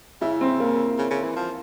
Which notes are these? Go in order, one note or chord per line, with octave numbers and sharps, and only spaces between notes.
C#3 E4
C4
A#3
C#3
C#3
E3
F3